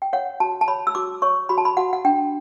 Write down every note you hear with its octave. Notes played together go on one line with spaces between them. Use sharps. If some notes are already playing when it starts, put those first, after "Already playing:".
G5
C#5 F#5
F#4 A5
A5
C#5 B5
E6
F#4 D6
C#5 C#6
F#4 B5
A5
B5
F#4 F#5
F#5
D4 G5